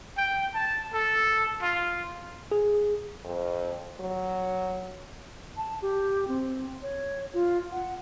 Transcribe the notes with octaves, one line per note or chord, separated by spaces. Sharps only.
G5
A5
A4
F4
G#4
F2
F#3
A5
G4
C4
C#5
F4
F#5